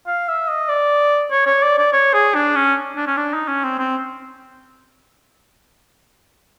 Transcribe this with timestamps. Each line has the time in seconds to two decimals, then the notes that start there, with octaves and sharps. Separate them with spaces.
0.07 F5
0.28 E5
0.49 D#5
0.69 D5
1.31 C#5
1.46 C#5
1.63 D5
1.78 D5
1.93 C#5
2.14 G#4
2.35 D4
2.56 C#4
2.96 D4
3.07 C#4
3.17 D4
3.34 D#4
3.48 C#4
3.64 C4
3.79 C4